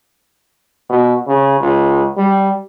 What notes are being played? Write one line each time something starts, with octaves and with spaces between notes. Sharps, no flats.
B2
C#3
C#2
G3